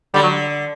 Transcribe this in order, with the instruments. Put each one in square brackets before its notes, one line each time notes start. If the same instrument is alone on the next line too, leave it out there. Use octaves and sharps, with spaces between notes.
[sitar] D3 [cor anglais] G3
[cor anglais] F#3